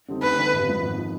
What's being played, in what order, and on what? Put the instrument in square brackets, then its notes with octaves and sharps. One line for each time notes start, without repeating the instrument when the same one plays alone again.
[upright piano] D3 G3 C4 D#4
[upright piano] D2 [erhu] B4
[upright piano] D3 G3 C4 D#4
G#1
G#2 F3
G#1
F3